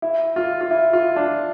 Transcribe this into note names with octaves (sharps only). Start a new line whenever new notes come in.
E4
F4
F4
E4
F4
D4